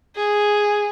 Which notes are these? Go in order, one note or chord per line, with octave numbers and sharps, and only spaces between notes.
G#4